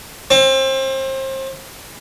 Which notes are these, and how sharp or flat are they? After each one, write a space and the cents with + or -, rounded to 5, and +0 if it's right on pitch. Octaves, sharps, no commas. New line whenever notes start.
C4 +30